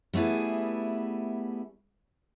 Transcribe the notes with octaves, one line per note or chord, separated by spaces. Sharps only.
G3 A3 B3 E4 G#4